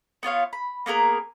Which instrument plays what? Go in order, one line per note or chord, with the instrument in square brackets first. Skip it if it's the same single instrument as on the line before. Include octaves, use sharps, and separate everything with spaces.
[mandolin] B3 F4 C#5 F5
B5
A#3 B3 G#4 A#4